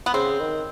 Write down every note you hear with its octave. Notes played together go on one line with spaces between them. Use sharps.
B3
C#3 C4
D#3